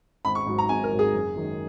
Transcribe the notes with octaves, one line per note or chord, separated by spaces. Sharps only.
G#1 B5
C#6
G#2 F#3
A#5
G#1 G#5
A#4
G#2 F#3
G#4
F#1
F#2 D#3 G#3